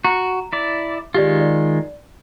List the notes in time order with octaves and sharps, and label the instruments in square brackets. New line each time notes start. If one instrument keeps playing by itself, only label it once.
[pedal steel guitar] F#4 [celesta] A#5
[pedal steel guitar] E4 D5
[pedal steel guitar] D#3 G#3 F4 [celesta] G4 D5
[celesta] D5